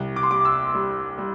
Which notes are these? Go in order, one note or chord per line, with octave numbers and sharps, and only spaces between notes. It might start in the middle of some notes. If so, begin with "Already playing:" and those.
Already playing: C2
D6
C6
G3 D6
E6
G3
G3